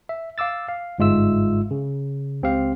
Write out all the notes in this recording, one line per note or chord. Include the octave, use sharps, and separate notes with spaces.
E5
F5 D6 E6 A6
F5
G1 G#2 G#3 F4 E5 E6
C#3
C#2 C4 G4 F5